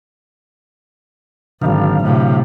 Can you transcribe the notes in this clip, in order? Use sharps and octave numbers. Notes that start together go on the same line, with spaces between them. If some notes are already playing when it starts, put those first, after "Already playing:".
G#1 D3 F#3 F5
A2 C3